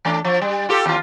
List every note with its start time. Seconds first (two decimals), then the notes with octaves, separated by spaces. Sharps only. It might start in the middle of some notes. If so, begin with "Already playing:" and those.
0.05 E3 A3 D4
0.24 F3
0.42 G3
0.69 F4 G4 A4
0.86 D#2 F4